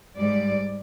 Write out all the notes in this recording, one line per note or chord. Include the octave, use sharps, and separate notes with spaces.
G#2 G3 D5